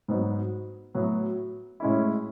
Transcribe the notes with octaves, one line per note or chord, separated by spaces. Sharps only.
G#2 F#3 B3 D#4
A2 F#3 B3
A2 G#3 C#4 E4